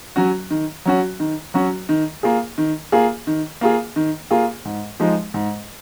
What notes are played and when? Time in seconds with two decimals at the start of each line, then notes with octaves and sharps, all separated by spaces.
0.16 F#3 C#4 F#4
0.50 D#3
0.85 F#3 C#4 F#4
1.20 D#3
1.54 F#3 C#4 F#4
1.89 D#3
2.23 A#3 F4 G#4
2.58 D#3
2.92 A#3 F4 G#4
3.27 D#3
3.61 A#3 F4 G#4
3.96 D#3
4.31 A#3 F4 G#4
4.65 G#2
5.00 F3 G#3 D#4
5.34 G#2